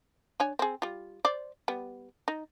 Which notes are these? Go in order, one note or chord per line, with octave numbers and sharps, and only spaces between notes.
D4 C#5 G#5
C4 G#4
G3 F4
C5 D5
G3 B3
D#4